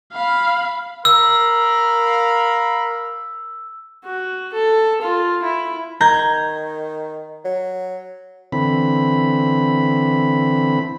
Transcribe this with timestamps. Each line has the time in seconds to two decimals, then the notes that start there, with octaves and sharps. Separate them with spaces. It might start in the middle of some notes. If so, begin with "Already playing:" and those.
0.13 F5 B5
1.05 A#4 F5 B5 E6
4.04 F#4
4.53 A4
5.01 F4
5.42 E4
6.01 D#3 A#5 G6 G#6
7.45 F#3
8.52 D3 E3 C4 B5